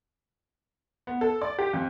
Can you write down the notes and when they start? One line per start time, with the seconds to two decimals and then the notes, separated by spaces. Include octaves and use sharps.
1.07 B3
1.21 A4
1.42 D5
1.59 G4
1.73 F2